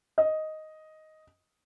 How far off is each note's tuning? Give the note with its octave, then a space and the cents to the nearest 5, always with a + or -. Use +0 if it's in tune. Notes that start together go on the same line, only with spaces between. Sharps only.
D#5 +5